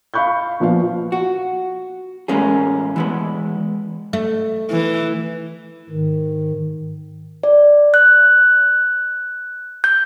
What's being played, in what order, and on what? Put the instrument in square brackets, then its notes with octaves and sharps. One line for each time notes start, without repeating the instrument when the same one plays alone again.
[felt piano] F5 B5 C#6 F#6 G6
A#2 F3 B3 F4 F5
[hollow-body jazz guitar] F#4
E2 A2 G#3 A#3 C#4 G#4
E3 G#3 B3
[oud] A3
[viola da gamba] E3
[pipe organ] G#2 D#3
[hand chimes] D5
F#6
G6